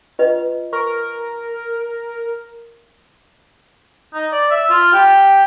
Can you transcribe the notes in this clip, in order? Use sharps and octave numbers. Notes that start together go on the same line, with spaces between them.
F4 B4 D#5
A#4 C#6
D#4
D5
E5
F4
G4